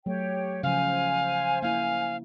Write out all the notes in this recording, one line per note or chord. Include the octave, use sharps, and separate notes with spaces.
F#3 A3 G4 C#5 G5
C#3 F3 C5 F5 G#5
A#3 E4 F5